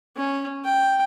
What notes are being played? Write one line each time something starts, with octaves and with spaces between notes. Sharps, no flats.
C#4
G5